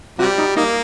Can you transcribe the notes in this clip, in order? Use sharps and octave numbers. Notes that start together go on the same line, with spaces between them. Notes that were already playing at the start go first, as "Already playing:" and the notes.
C3 G3 F#4
D#4
A#3 D#4